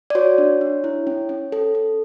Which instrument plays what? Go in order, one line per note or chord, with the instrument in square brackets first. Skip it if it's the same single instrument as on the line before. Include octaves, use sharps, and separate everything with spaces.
[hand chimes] D5
F#4 C#5
D4
D4
E4
C#4
C#4
A4
A4